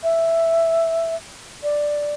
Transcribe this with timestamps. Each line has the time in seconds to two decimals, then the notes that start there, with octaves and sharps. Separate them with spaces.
0.03 E5
1.63 D5